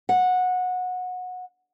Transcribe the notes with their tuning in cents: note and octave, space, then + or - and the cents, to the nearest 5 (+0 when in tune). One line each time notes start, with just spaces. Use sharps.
F#5 -20